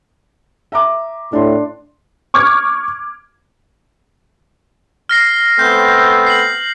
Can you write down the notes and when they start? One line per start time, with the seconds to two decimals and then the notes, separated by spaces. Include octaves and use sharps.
0.72 E5 A#5 D6
1.33 A2 D4 C6
2.34 C#6 D6 F6 G#6
5.09 F6 A#6 C7
5.59 A3 B3 C4 G6
6.27 C7 F#7